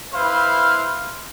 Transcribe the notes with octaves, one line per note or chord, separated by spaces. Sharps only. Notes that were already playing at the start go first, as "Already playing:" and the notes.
E4 B4 C5 F5